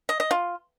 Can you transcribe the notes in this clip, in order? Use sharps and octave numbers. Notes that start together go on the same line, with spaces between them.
D#5
D#5
F4